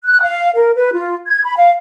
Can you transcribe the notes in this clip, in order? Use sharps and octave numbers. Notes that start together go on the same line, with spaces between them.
F#6
F5
A#4
B4
F4
G#6
B5
F5